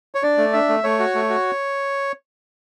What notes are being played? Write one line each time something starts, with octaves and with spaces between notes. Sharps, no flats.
C#5
D4 D5
A3
D4 E5
A3
A3 C#5
F#4
A3
F#4